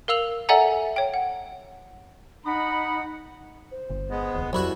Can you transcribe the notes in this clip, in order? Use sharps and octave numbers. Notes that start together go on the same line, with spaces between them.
A#4 F5 E6 F7 F#7
A4 D5 E5 F#5 G#5 A#5
C#5 G5
F#5
D#4 D#5 F#5 B5
C5
G1
G#3 B3
D#1 C2
C2 F2 F#3 E4 F#4 B5